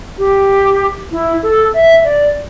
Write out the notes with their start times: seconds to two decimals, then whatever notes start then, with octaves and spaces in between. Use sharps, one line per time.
0.18 G4
1.12 E4
1.43 A4
1.74 E5
2.04 D5